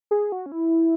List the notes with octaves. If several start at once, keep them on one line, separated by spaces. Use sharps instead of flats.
G#4
F#4
C#4
E4